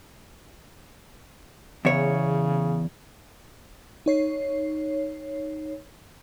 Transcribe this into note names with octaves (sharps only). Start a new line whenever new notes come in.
E2 C#3 C#5
D#4 C#5 C7